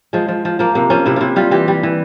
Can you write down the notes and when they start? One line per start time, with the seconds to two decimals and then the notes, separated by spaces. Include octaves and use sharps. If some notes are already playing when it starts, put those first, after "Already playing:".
0.13 F3 G#3
0.28 F3
0.45 F3
0.59 F3 A#3
0.75 C3 A#3
0.90 F3 C#4
1.06 C3 E4
1.16 C3 E4 F4
1.36 G3 F4
1.51 E3 G4
1.68 G3
1.83 E3